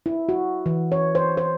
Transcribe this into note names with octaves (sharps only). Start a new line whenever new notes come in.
E4
F#4
E3
C#5
C5
C5